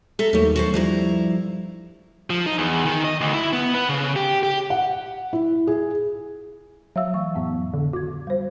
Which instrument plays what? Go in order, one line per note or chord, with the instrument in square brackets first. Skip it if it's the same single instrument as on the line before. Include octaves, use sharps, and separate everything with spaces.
[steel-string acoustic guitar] A4 E5 A#5
[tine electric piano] D#2 D#3 F#3 [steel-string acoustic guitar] G3 A3
[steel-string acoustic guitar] F#4 A4 C5
[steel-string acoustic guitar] G2 E4 A#5 [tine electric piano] F3 G3
[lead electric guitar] F3
D#4
E2
D#3
D#5
D2
E4
B3
B3
C#3
G4
G4
[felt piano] F#5
E4
G#4
[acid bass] F#3 [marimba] E5 F5 E6
[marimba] E3 A3 C#6
F2 A2 B3
[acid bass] D3
[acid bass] F#4 [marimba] D6 G#6
[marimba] G3 C5